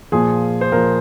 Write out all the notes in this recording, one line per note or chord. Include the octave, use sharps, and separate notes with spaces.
A#2 F3 G#4
C5
A#2 F3 A#4